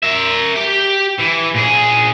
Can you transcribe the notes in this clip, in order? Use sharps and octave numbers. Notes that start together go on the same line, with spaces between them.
A#4 E5
G4 G5
E3
A#2 G#4